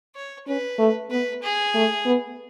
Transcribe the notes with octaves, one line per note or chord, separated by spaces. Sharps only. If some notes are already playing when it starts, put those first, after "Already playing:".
C#5
C#4 B4
A3
B3 B4
G#4
A3
B3